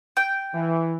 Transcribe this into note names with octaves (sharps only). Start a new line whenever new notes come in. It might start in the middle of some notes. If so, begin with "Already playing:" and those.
G5
E3